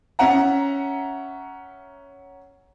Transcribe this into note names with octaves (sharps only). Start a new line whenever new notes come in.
C#4 E5 F#5 A#5